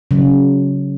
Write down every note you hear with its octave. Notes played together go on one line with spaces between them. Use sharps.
C#3 F#3